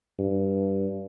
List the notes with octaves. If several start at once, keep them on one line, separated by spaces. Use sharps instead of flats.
G2